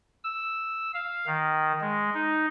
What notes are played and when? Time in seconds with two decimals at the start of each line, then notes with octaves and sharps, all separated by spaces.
0.24 E6
0.94 F5
1.27 D#3
1.81 G#3
2.14 D#4